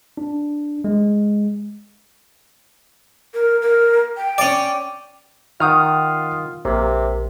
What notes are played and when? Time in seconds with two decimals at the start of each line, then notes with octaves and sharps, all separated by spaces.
0.17 D4
0.84 G#3
3.34 A#4
3.62 A#4
4.17 G5
4.38 C#4 D5
5.60 D#3 F4 F#5 D#6 F6
6.65 A#1 C3 A#3